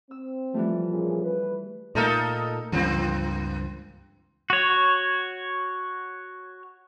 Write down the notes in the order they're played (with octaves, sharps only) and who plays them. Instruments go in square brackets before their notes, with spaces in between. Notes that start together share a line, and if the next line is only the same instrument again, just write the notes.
[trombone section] C4 [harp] E6
[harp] E3 G3 A3 [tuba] F3
[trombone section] A#2 C#4 G#4
B4
[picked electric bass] A#2 A3 A#3 [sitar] D#4 A4 A#4
[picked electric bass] C#2 G2 [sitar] E3 A#3 C4
[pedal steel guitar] F#4 C#5